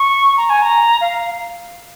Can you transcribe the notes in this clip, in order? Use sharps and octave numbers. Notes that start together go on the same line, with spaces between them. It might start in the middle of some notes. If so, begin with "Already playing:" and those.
Already playing: C#6
A#5
G#5
A#5
F5